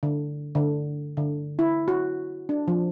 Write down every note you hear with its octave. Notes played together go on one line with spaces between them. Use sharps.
D3
D3
D3
E4
F#4
D4
F3